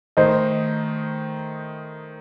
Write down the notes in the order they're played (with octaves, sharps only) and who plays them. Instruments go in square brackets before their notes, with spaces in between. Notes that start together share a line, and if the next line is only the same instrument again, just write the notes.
[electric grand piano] D#3 A3 D#4 [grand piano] C5 D#5